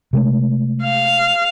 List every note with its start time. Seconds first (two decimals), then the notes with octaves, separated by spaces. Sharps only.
0.13 C3 G#3 A3
0.83 F5